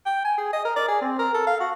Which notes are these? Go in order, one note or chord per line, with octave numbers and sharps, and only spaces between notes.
G5
G#5
G#4
D#5
A#4
D5
G#4
C4
A#4
A4
F5
F#4